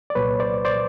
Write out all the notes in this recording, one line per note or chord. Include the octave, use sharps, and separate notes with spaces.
D5
C2 A#2 F#3 B4 C#5
C5 D5
C5 D5